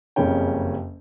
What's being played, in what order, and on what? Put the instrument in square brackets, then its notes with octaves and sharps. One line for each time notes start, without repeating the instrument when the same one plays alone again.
[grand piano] F#1 F2 C#3 G3 C#4 G5